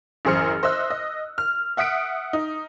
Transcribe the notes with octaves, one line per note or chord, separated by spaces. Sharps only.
A1 F#2 G#4 C5 F6 C#7
C5 D#5 E5 E6 F#6
D#5
F6
E5 F#5 D#6 B6 D7
D#4